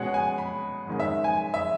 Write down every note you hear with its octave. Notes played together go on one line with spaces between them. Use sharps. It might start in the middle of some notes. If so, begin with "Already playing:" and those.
Already playing: B2 G#3 C#4 F#5
G#5
B5
G#2 D#3 G#3 C#4
E5
G#5
E5